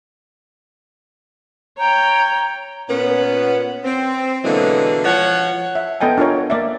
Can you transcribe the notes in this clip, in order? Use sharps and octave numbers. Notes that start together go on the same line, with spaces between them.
C#5 G5 A#5
A#2 B3 C#4
C4
B2 D3 E3 F#3 G#3 A#3
F3 C#5 F#5
E5
B3 A4 D#5 G5 G#5
D4 F4 A#4 C#5
A#3 D5 E5